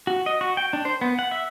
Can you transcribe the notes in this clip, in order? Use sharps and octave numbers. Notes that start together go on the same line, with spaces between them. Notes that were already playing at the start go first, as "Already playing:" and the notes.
F#4
D#5
F#4
G5
D4
C5
B3
F#5
E5